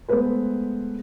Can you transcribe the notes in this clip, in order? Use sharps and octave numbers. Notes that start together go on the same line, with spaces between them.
G#3 A3 B3 B4 C5